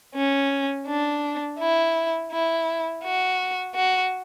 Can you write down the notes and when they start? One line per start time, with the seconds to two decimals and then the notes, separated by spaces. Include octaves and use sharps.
0.15 C#4
0.87 D4
1.59 E4
2.32 E4
3.04 F#4
3.75 F#4